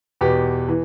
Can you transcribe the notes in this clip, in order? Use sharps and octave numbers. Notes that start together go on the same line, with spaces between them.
E2 B2 B3 G4
E3